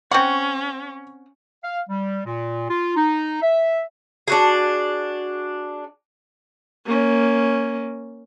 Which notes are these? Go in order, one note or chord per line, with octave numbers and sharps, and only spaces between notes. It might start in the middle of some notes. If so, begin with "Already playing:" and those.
C4 C#4 F#5 C#6
F5
G3
A#2
F4
D#4
E5
D4 F#4 G#4
A#3 C#4